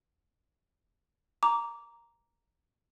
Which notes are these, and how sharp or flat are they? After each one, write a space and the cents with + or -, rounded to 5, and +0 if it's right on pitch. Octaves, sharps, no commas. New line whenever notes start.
A#5 +0 D6 -15